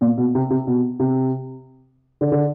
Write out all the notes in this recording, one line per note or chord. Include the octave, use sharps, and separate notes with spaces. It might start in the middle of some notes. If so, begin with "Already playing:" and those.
A#2
B2
C3
C3
B2
C3
D3
D3